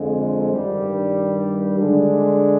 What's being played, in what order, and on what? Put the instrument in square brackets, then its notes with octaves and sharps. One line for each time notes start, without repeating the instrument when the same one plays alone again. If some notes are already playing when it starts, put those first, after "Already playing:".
Already playing: [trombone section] F2 D3 F3 G#3
G2 D#3 G3
D3 G#3 D4